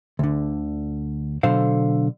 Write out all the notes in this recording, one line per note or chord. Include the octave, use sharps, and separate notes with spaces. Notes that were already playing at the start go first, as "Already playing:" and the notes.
D2 D3
B2 D3 F#3 A4 C5 F5